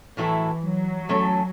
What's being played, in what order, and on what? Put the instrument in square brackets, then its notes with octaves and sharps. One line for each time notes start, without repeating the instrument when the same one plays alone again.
[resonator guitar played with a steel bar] A2 F#3 A3 E4 A4 [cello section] E3
[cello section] F#3
[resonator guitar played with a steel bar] E3 A3 C#4 A4